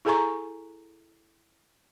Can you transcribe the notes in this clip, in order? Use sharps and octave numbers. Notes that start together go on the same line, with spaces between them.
E4 G#4 A4 G#5 A#5 C#6